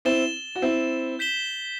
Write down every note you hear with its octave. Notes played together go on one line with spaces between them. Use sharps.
C4 E4 A6 E7 G7
F#4
C4 E4
G6 B6 E7 G7